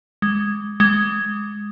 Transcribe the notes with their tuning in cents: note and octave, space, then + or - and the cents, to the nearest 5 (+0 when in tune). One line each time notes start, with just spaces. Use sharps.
G#3 -5
G#3 +0